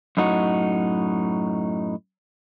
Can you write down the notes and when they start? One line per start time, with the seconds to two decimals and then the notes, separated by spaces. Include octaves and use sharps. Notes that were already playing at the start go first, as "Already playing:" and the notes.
0.17 F#2 A2 D#4 F#4